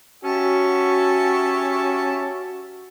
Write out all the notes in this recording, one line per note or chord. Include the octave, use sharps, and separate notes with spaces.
C#4 F#4 G4 E5 A5